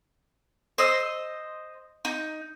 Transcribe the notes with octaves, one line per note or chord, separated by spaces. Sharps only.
C5 D#5 E6
D#4